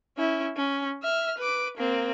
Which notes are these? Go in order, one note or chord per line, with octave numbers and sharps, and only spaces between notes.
C#4 E4
C#4
E5 F6
B4 D6
A#3 C4